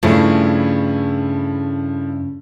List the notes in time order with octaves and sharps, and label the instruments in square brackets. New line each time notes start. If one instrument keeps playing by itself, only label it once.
[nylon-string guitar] G2 [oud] C#3 [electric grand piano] F3 A3 E4